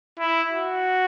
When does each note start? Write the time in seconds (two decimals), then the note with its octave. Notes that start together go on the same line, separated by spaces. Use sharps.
0.19 E4
0.52 F#4